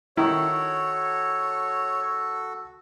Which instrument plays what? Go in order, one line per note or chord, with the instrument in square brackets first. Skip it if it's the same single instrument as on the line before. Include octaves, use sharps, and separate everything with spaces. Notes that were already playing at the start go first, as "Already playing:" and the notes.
[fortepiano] D#3 E4 [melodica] F#4 A4 [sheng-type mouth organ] C#5